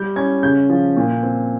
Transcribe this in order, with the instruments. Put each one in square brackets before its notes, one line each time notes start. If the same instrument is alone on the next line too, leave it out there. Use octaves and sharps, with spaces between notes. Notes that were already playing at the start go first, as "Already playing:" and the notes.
Already playing: [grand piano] G3 G6
C#4 G#6
C#3 G6
F3
A#2
C4